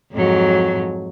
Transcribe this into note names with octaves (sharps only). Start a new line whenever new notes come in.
F2 G#2 F#3